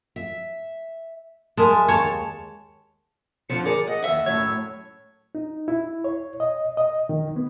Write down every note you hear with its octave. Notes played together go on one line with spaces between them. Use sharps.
E5
G#3 A#4 E5 A5
D#2 C#5 A5
F2 D3 F3 C#7
G#4 A#4 D5
D#5 F#5
D#2 E5 E6
F#2 A2 C#5
D#4
E4
C#5
D#5
D#5
D#3
B3